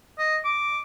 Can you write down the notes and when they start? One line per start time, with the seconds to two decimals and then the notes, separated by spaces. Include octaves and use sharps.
0.18 D#5
0.44 D6